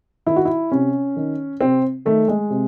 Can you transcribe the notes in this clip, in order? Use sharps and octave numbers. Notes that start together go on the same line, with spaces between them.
D#3 E4
F#4
E4
C3 C#4
D#3
C3 C4
D#3 A3
G#3
C3